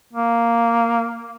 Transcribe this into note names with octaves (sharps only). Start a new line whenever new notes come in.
A#3